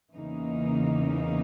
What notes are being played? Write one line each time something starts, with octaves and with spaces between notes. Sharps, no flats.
E2 C#3 E3 A#3 D#4